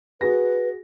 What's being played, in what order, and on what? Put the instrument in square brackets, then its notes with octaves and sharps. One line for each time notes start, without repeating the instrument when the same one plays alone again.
[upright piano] F#4 G#4 A#6 [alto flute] B4